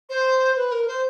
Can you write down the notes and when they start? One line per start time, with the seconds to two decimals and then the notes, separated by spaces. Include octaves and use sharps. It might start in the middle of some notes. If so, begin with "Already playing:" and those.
0.09 C5
0.56 B4
0.71 A#4
0.88 C5